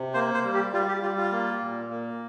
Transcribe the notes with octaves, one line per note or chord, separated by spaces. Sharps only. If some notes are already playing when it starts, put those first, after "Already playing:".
Already playing: C3
A#3 C5
C5
G3
G4
G3 F4
G4
G3 F4
F4
A#3
A#2
A#3